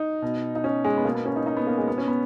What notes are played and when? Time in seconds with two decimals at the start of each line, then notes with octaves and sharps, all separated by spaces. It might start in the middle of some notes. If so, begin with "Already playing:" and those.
Already playing: D#4
0.22 B2
0.55 D#4
0.64 C#4
0.84 G#3
0.97 B3
1.05 B2 A#3
1.15 B3
1.25 C#4
1.36 D#4
1.46 D#4
1.57 B3
1.67 A#3
1.77 G#3
1.88 B2 B3
1.98 C#4
2.08 B3